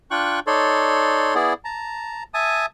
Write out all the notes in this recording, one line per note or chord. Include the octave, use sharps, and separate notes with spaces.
D4 F4 G5 C#6 F#6
D#4 A4 C#5 D5 C6
B3 E4 G#4 D5
A5 A#5
E5 G#5 A5 D#6